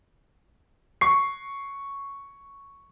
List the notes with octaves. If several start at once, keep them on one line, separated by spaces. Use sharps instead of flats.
C#6 C7